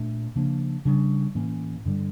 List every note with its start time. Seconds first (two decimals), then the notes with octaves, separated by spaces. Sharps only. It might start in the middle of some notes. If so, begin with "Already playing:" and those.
Already playing: A#2 A3 D4
0.36 C#3 F3 A#3 D4
0.85 C#3 G3 D4
1.35 A2 E3 A#3 C#4
1.85 G2 D3 G3